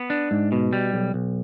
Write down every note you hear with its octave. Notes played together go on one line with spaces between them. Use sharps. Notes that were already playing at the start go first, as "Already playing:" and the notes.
Already playing: B3
D4
G#2
B2
G3
B1
B1